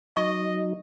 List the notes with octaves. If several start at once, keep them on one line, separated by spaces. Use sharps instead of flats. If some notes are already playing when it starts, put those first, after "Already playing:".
F#3 D#4 D#5 C#6